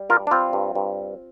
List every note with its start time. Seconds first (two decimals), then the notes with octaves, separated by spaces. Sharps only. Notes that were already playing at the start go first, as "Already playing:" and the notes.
Already playing: G3
0.09 G2 F4 A#4
0.27 D4
0.31 G3 C4 F4
0.53 G2
0.75 G2